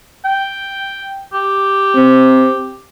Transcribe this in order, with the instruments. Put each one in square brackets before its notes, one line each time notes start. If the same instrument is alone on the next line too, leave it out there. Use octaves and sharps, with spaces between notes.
[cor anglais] G5
G4
[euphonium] C4